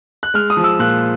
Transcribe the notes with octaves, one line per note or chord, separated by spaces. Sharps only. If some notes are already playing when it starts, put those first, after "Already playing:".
F#6
G#3 F6
D#6
F3
E6
A#2 F#6